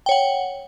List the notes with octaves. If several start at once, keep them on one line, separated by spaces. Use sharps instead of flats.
C#5 F#5 G5